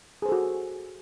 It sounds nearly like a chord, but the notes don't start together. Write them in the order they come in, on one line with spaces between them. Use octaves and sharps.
G#4 C5 A4 F#4